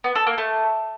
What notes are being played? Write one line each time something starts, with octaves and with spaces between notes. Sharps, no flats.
B3
A4
A#3
A3